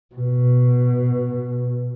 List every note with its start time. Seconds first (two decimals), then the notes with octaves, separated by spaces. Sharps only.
0.15 B2